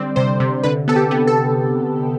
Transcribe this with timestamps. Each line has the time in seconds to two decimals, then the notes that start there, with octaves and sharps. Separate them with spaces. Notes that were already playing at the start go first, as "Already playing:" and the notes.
Already playing: D3 G3 C4 D5
0.16 C3 C5
0.40 C3
0.63 D3 B4
0.88 B3 A4
0.96 G4
1.11 B3
1.27 A4